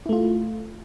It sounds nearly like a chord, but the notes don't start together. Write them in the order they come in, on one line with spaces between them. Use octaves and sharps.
E4 A3 F4